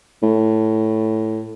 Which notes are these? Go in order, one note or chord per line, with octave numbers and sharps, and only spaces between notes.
A2